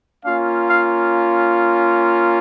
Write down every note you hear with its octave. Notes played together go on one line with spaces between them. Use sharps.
A#3 C#4 F4 F5
F5